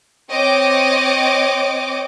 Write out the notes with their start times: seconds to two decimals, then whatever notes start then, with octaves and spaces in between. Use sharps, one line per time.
0.30 C4 C#5 D#5 G5 D6